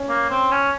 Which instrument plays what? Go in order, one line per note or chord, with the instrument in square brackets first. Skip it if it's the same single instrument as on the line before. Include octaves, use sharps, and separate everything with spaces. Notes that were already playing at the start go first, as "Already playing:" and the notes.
Already playing: [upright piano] C#4
[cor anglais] A#3
C4
C#4